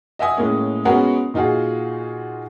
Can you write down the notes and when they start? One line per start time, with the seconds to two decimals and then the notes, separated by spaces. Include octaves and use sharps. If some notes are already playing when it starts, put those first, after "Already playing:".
0.19 D#5 E5 F#5 G#5 D#6
0.37 A2 G#3 A#3 C#4
0.85 G#3 B3 C#4 F#4 A#4 F#5
1.34 A#2 D#4 F4 F#4 G#4